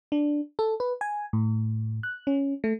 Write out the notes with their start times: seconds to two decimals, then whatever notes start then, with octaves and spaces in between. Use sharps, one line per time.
0.12 D4
0.59 A4
0.80 B4
1.01 G#5
1.33 A2
2.03 F#6
2.27 C#4
2.64 A3